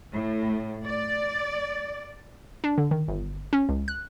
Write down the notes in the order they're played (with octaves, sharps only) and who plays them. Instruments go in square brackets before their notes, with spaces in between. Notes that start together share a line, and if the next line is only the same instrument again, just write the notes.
[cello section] A2
D5
[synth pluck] D4
D3
D#3
G1
C#4
C#2
F#6